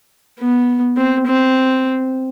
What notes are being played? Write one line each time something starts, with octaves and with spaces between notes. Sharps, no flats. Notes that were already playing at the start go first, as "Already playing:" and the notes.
B3
C4
C4